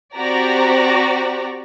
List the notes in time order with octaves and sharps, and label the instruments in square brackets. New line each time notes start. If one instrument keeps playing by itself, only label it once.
[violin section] C4 F#4 G4 D5 A#5